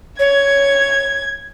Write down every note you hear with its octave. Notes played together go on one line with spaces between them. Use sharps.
C#5 G#6